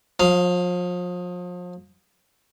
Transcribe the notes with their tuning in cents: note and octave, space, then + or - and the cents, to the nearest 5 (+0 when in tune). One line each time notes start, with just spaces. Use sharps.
F3 +35 F5 +0